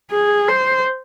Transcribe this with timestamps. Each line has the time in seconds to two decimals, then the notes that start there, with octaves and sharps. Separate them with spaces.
0.11 G#4
0.48 C5